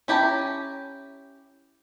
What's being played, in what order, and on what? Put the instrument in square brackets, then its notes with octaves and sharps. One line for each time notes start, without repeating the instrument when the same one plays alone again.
[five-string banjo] C#4 E4 G4 A5 A#5